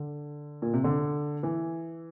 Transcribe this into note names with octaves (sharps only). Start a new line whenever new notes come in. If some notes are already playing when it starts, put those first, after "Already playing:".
Already playing: D3
A#2
C3
D3
E3